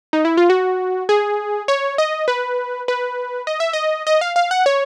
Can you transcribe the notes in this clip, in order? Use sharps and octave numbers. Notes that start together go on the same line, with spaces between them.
D#4
E4
F4
F#4
G#4
C#5
D#5
B4
B4
D#5
E5
D#5
D#5
F5
F5
F#5
C#5